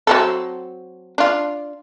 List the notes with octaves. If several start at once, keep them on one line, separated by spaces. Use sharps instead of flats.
F#3 C4 A4
D4 F4